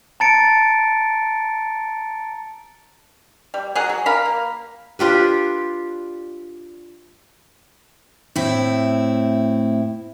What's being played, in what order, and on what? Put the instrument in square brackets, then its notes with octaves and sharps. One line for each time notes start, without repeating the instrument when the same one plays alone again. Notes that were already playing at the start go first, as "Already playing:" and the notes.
[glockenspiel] A5 A#5 A6 C#7 D7
[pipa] G3
F#3 G#4 A#4 F#5
F#3
A#4 F5 A#5 B5
A#3
[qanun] D4 F4 G4 B4
[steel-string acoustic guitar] A2 C4 E4